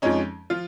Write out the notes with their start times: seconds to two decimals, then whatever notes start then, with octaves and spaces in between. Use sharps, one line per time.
0.02 F2 F3 G#3 C#4 D#4
0.50 F3 F4